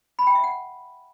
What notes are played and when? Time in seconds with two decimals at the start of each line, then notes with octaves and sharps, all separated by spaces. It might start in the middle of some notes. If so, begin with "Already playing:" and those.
0.19 B5
0.27 G5
0.35 E5
0.44 F#5